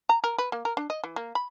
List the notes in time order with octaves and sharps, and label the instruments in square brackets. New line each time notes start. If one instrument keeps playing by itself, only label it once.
[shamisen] A#5
A#4
B4
A#3
A#4
D4
D#5
E3
A#3
B5